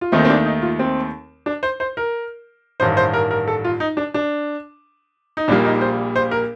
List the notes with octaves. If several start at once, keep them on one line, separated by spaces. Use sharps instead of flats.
F4
D#2 D#3 A3 C4 D#4
C4
D4
D#4
F4
C4
D4
C5
C5
A#4
A1 G2 D#3 C5
C5
A#4
A#4
A4
F4
D#4
D4
D4
D#4
A#1 A#2 G3 A#3 D4
D#4
C5
C5
A#4